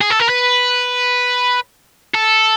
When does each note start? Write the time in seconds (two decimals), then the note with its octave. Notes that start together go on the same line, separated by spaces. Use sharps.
0.01 G#4
0.10 A4
0.20 A#4
0.29 B4
2.14 A4